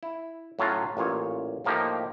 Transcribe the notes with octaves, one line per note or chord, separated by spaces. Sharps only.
E4
A2 F#3 C#4 F4
A1 A#2 F4 C#5
A2 F3 A#3 D#4 G4